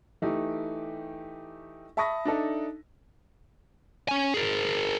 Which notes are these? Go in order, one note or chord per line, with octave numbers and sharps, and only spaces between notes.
E3 A3 D#4 G4
E5 A5 B5 C#6 D#6 A#6
D4 D#4 A4 E5
C#4 G#5
G#4 A#4